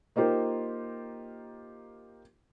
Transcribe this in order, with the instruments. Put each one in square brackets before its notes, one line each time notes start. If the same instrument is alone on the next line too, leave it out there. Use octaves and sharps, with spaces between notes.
[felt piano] A#3 D#4 F4 G4 A#4 C5